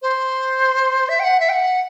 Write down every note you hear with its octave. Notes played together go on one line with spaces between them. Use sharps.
C5
E5
G5
F#5
E5
G5
F#5